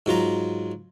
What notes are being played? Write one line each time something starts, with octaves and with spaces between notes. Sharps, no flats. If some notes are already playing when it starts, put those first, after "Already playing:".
G#2 F#3 F4 A#5